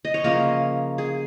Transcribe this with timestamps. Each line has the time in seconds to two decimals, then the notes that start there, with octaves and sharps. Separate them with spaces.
0.05 D#5
0.14 C#5
0.24 C#3 F3 A#3 A#4
0.98 G#4